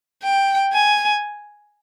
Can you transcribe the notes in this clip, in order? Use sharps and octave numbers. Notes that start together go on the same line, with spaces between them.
G5
G#5